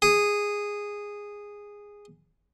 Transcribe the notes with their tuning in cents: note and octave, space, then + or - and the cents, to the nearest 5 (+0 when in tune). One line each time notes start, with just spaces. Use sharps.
G#4 -10